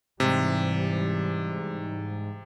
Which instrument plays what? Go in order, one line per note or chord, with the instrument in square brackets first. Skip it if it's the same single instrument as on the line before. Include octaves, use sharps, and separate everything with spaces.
[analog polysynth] G#2 [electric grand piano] C3 [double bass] E3 G3